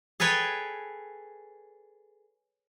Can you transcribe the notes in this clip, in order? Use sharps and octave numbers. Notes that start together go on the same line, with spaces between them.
G#4 A4 B4 C#5 G5